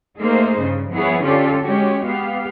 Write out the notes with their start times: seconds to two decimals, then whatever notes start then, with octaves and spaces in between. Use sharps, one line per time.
0.20 A3 A#3 D#4 G#4 C5
0.59 G2 C#3
0.93 F3 B3 E4 G#4 B4 C#5
1.24 D3 C#4 F4 G4 A4 D5
1.62 G#3 C#4 F#4 G4 C#5
2.06 B3 G4 F5